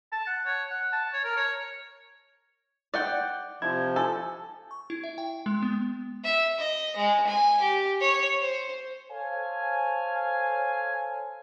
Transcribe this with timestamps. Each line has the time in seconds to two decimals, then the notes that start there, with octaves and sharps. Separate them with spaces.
0.12 A5
0.27 F#5
0.46 C#5
0.70 F#5
0.93 A5
1.13 C#5
1.24 A#4
1.37 C#5
2.94 D5 F#5 G5
3.62 C3 F3 E4 G#6
3.96 A4 G#5
4.71 C#6
4.90 E4
5.04 E5
5.18 G5
5.46 G#3
5.63 B3
6.24 E5
6.59 D#5
6.96 G#3
7.27 G#5
7.61 G4
8.01 C#5
8.40 C5
9.11 A4 C5 C#5 F5 G#5